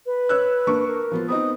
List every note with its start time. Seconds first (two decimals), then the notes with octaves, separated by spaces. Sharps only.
0.06 B4
0.29 C#5 E6 F#6
0.67 A#3 D4 C#6
0.88 A#4
1.12 F3 B3 F4
1.29 B3 C4 D#4 D#6